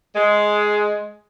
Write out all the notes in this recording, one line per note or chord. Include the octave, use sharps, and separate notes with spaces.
G#3